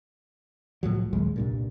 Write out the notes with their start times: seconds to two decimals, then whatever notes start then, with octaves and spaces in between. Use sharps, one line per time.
0.83 C2 A2 F3 F#3
1.13 A#1 D#2 F#3 G#3
1.36 C2 G2 A#2